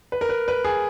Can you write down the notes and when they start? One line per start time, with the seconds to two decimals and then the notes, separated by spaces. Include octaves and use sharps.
0.12 B4
0.21 A#4
0.29 B4
0.48 B4
0.65 G#4